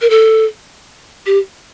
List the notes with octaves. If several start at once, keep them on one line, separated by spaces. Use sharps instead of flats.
A#4
A4
G4